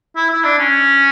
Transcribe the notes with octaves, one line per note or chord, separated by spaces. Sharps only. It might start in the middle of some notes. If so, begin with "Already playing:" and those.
E4
E4
D4
C#4